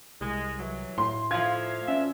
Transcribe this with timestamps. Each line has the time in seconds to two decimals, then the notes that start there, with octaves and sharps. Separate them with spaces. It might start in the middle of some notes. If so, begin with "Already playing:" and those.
0.21 C2 G#3
0.59 E3 F#3
0.98 A2 C6
1.31 D3 F3 F4 E5 F5 G#6
1.88 A2 C#4 D4 E5